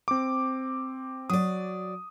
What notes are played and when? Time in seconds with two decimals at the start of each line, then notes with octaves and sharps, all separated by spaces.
0.08 C4 D6
1.30 F#3 D5 D#6